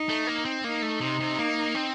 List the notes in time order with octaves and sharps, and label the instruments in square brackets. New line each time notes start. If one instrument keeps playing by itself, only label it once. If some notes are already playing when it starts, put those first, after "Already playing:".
Already playing: [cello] D#4
[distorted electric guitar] A3
A#3
C4
[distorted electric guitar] A#3 [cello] D#4
[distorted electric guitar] A3
C3
C3
A#3
C4